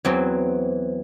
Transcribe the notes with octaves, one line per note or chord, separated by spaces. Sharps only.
E2 E3 F#3 C4